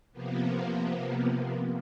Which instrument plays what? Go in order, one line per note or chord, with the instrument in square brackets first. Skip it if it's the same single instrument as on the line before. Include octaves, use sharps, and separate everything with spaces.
[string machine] C3 F3 A#3 B3